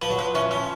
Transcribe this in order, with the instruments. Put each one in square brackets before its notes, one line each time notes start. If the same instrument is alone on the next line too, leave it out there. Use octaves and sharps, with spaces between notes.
[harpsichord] F3 [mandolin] B4
[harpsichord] F#3
[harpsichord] F3 [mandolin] B4
[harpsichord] E3 [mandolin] C#4
[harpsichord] F3 [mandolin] C#4